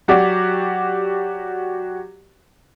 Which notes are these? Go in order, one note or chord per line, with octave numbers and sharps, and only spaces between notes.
F#3 F#4 G4 D5